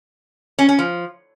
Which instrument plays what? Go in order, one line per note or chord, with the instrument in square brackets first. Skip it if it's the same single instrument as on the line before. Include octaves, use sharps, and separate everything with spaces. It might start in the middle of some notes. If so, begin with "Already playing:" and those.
[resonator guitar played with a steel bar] C#4
C#4
F3